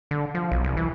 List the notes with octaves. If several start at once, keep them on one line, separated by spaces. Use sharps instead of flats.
D3
F3
B1
C2
E3